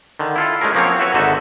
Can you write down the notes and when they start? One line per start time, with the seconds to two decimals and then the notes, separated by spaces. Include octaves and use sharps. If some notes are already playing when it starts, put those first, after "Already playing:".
0.19 D3 D#3
0.36 E4 F4 A4
0.61 G#3 A3 C#4 G#4 A#4
0.75 F3 F#3 A#3 C4 C#4 C#5
0.99 E4 F#4 A4 B4 C#5
1.14 G#1 D3 D#4 F#4 A4 E5